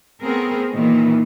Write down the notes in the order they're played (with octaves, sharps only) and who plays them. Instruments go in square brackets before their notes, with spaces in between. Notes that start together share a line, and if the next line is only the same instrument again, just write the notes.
[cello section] A3 B3 C4 G#4 A#4
A#2 D#3 E3 A#3